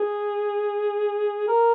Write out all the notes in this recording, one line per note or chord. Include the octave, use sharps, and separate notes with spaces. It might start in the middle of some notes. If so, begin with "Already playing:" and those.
Already playing: G#4
A#4